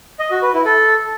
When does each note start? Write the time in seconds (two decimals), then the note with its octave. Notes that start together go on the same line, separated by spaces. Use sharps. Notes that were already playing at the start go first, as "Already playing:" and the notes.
0.19 D#5
0.31 F#4
0.42 B4
0.54 E4
0.65 A4